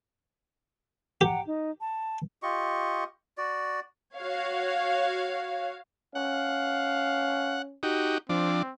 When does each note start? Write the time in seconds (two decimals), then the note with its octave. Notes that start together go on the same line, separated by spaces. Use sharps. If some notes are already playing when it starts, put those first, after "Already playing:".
1.21 G4 F#5 G5 A#5
1.46 D#4
1.80 A5
2.43 F4 G4 D#5 C#6
3.38 F#4 D5
4.16 F#4 C#5 F5
6.15 C#4 F5 F#5
7.83 D#4 F#4 G4
8.29 F3 C4 D4